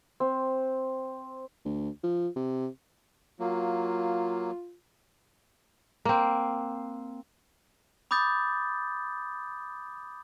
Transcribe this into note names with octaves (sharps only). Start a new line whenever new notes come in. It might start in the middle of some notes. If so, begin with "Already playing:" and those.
C4
D2
F3
C3
F#3 A#3 F4
A#3 C4
B5 D6 D#6 G6 A6